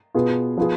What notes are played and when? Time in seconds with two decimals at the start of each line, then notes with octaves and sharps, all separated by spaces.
0.14 B2 B3 F4 G#4
0.57 F3 B3 F4 G#4